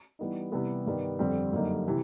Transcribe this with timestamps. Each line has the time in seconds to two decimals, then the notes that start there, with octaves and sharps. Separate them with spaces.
0.19 E3 G3 B3 D#4
0.52 C3 E3 G3 B3
0.86 G2 D#3 G3 B3
1.19 F2 D3 G3 C4
1.52 F#2 D3 G3 A#3 D#4
1.88 C3 E3